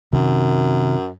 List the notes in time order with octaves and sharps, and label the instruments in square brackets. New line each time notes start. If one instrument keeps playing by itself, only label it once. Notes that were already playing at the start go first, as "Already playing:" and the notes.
[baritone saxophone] F#2 [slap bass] C3 D#3